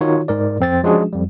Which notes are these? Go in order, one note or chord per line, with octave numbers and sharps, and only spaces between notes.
D#3 D#4 F4 F#4 C#5
G#2 A#4 D5
F2 C4 A6
F3 G#3 C#4 D4 F#4 G#4
F2 G3